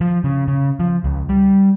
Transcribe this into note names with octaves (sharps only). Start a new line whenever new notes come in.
F3
C#3
C#3
F3
C#2
G3